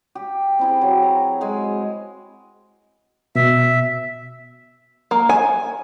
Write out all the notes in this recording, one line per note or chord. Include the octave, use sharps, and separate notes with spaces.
G4
C4 E4 G#4
F#3
A#5
G#3 G#5
B2 E5
A#3
G#5